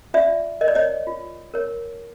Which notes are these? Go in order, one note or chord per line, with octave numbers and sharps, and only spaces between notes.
F4 D5 E5
A#4 C#5 D#5
D5
C#5 D#5
F4
A#4 C#5